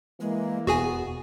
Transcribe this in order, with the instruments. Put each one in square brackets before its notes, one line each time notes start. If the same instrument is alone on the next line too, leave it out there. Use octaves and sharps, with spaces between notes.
[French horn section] E3 A#3 [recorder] G#3
[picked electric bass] E1 [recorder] B3 [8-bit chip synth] F#4 G#4 G#5